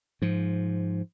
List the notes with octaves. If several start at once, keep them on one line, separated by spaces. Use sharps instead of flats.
G#2 F3